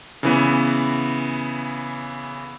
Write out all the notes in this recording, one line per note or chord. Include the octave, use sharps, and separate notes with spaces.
C#3 E3 B3